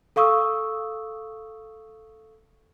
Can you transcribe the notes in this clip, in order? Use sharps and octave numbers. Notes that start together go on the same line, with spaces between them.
A4 F5 C#6 D#6 E6